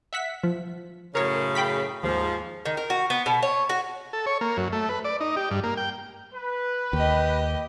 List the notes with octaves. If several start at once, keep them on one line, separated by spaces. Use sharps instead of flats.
E5 F#5 B6
F3
F#2 A2 C#3 A#4 C#5
G5 B5 B6
D#2 G#2 F3
D#3
A#4
F#4
B3
B2
C#5
F#4
A4
C#5
A#3
F#2
A3
B4
D5
D#4
G4
G2
A#3
G5
B4
D#2 G4 D#5